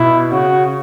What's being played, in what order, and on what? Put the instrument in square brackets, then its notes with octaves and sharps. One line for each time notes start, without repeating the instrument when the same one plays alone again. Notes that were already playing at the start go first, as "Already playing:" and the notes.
Already playing: [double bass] B2 [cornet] E4
[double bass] C#3 [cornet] F#4